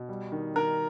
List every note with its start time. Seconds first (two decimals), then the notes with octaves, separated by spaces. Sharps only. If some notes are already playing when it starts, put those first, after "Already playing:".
Already playing: B2
0.09 G3
0.32 D#3
0.55 D#3 A#4